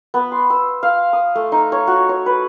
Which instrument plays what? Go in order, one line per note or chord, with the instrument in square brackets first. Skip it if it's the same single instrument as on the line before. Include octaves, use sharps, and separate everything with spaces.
[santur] B3
C6
E6
F5
D#6
A3
D#4
C#5
F#4
C#5
B4